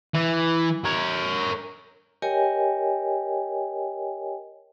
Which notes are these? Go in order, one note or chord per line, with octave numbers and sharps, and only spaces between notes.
E3
A#4 C#5
G4 A#4 C#5 D#5 G5 G#5